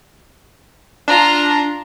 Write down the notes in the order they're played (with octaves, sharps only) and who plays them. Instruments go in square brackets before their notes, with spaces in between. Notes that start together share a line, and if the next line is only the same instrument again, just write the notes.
[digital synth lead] D4 [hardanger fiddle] F4 A#5